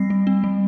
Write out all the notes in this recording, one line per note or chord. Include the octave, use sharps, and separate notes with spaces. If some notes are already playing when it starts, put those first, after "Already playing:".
Already playing: G3 C4 A#6 C7
G3
C4
G3